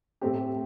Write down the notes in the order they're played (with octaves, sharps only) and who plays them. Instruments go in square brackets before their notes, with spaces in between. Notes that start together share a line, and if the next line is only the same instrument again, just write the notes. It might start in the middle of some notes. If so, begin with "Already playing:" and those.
[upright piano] A2 A3 C4 G4